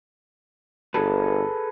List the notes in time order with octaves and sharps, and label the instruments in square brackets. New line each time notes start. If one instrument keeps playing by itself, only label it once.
[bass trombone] G1 [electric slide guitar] G#4 A4 B4